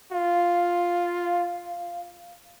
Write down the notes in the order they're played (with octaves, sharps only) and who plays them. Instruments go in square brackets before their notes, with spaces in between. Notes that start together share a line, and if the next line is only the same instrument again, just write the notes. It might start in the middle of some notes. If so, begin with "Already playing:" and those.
[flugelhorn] F4 [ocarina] F5